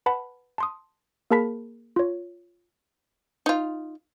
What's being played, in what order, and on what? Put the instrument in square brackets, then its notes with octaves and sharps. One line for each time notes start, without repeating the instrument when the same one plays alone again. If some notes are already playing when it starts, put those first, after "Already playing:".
[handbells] B4 F#5 A5 B5
A5 C6 D#6
A#3 G#4 A#4 A5 B5 B6
F4 C#5
[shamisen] D#4 F4